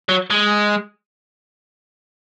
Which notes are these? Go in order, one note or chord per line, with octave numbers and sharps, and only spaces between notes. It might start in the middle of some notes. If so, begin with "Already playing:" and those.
F#3
G#3